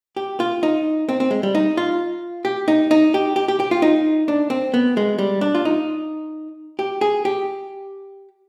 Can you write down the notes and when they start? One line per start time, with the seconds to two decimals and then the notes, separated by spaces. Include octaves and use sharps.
0.17 G4
0.40 F4
0.63 D#4
1.09 C4
1.20 C4
1.31 G#3
1.43 G3
1.55 D#4
1.77 F4
2.45 G4
2.68 D#4
2.91 D#4
3.14 G4
3.36 G4
3.48 G4
3.60 G4
3.71 F4
3.82 D#4
4.28 D4
4.50 C4
4.74 B3
4.97 G#3
5.19 G3
5.41 D4
5.55 F4
5.65 D#4
6.79 G4
7.01 G#4
7.25 G4